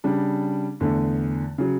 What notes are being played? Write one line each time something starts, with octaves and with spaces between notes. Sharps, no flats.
C#3 G3 D4
E2 D3 A3
C#3 F#3